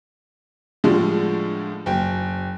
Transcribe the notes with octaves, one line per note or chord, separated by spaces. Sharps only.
A2 D3 F3 G3 G#3
F#1 G5